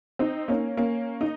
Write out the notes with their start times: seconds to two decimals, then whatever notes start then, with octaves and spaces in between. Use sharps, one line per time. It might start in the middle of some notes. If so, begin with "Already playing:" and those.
0.19 C4 D#4
0.48 A#3 C#4
0.77 A#3 C#4
1.21 D#4